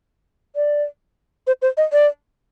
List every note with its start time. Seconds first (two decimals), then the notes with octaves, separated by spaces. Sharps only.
0.56 D5
1.47 C5
1.62 C5
1.77 D#5
1.93 D5